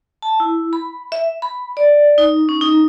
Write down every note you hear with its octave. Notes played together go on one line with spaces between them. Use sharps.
A5
E4
B5
E5
B5
D5
D#4
C#4
D#4